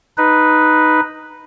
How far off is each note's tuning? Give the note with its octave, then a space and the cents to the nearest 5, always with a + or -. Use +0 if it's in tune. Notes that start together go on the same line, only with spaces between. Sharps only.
D#4 +0 B4 +0